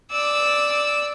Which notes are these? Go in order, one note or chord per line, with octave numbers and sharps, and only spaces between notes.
D5 E6